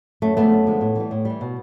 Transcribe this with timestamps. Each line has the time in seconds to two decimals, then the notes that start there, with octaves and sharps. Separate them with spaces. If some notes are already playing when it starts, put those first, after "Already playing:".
0.22 F#2 A3
0.37 D3 F3 G#3 A3 B3
0.51 F#2
0.67 D3 F3 G#3
0.81 A2
0.96 E3 G3
1.11 A2
1.25 E3 G3
1.41 B2